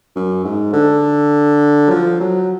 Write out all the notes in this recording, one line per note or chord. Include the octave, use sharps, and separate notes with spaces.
F#2
G#2
D3
F#3
F3
F#3